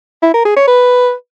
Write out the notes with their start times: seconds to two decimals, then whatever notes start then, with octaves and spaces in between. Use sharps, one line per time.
0.23 E4
0.34 A#4
0.45 G#4
0.56 C#5
0.67 B4